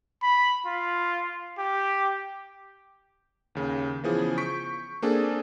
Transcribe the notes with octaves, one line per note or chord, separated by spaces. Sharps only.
B5
F4
G4
D#2 C#3
C#3 E3 F3 B3 G#4
C#6 G6 B6 D7
A#3 C4 D4 G#4 A4